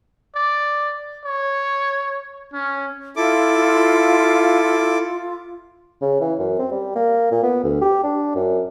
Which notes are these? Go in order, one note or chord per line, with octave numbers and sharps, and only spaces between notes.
D5
C#5
C#4
E4 F4 A4 D6
C#3
E3
F#2
C4
G3
A#3
A#2
B3
D2
G4
D4
F#2